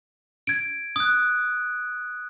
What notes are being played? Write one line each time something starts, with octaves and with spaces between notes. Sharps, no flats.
G#6 D7
D#6 F#6